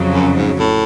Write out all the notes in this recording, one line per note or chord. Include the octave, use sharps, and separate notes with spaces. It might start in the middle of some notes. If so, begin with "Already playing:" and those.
Already playing: F2 C#3 F#3
F#2
G#2
A2